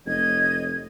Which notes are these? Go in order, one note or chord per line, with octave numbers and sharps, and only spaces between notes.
F1 C#5 D#5 G#6